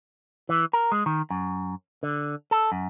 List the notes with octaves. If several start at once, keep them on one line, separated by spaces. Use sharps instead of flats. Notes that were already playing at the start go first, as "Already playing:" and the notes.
E3
A#4
G#3
D#3
F#2
D3
A4
F#2